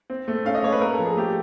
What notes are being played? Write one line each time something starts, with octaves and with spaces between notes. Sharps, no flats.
C4
A3
C#4 F5
D#5
A3 C#5
B4
A#3 A#4
A4
F3
G#4
A3 G4